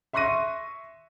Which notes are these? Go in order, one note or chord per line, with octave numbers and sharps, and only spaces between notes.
E5 C6 C#6 F#6 A#6 D#7